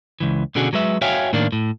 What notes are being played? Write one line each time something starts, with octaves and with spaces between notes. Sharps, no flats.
C#2 E3
B2 D3 C#4 F#4 G#4
F#3 G#3 B4 E5
F#4 C#5 E5 F5 G5 G#5
A2 D#3 A#3 D4
A2